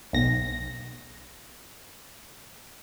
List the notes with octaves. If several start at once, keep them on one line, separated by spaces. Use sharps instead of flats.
B1 A#6